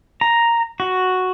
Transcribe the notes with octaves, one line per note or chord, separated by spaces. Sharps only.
A#5
F#4